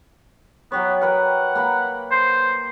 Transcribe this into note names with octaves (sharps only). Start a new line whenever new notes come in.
F#3 B3 G4 C#5
A#4 B4 F#5 G5
A#3 A#5 B5
C5